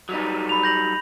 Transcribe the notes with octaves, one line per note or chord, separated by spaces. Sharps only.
F#3 G3 D#4
B5 F7
G6 A#6 F#7